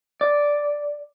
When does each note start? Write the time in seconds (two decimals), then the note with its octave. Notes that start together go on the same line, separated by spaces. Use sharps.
0.21 D5